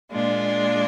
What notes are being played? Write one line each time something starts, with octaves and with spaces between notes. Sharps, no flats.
A#2 G#3 D4 F4